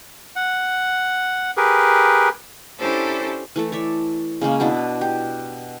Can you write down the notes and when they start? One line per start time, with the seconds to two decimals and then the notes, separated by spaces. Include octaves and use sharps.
0.36 F#5
1.57 G4 G#4 A#4 B4
2.79 C#4 D4 E4 G4 A4 C5
3.56 E3 A3 A4
3.72 C#5 D5 E5
4.41 C#3 G#3 A#3 C#4
4.60 B2 B3 D4 E4
5.01 G4